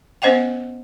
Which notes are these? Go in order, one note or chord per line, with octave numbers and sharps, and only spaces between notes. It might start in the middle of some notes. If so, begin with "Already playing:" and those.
B3 C#4 C5 D#5 F#5 G5